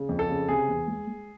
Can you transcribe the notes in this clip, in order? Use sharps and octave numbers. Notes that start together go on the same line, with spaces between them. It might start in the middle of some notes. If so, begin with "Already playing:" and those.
Already playing: C#3
F2
A4
C#3
C3 G#4
E2
G#3
G#3